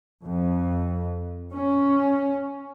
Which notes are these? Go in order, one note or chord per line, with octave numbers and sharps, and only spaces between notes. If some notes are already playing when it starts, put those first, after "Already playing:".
F2
C#4